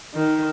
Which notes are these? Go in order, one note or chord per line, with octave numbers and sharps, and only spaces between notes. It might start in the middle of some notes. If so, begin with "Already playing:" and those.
D#3